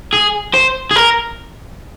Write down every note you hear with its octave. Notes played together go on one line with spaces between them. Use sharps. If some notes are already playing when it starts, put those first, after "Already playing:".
G#4
C5
G#4
A#4